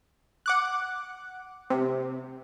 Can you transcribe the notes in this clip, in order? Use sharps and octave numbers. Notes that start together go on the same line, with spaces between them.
F#5 D6 F#6
C3